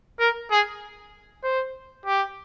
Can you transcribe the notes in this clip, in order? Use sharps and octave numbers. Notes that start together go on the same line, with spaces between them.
A#4
G#4
C5
G4